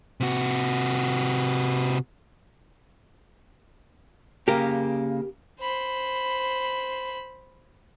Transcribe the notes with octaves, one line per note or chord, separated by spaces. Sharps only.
C3 F#4
C#3 A#3 G4 A#4
C5 B5